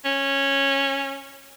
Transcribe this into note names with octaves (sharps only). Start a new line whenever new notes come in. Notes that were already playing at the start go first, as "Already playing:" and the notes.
C#4